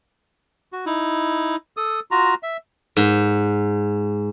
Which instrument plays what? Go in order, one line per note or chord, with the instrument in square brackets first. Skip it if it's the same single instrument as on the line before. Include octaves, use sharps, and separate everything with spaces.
[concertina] F#4
D#4 E4
A4 D#6
F4 F#4 A#5
E5
[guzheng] G#2